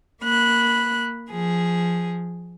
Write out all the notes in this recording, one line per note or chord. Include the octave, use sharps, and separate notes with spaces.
A#3 B5 F#6
F3 G#4